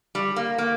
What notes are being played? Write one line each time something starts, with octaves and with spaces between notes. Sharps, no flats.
G3
A#3
A#3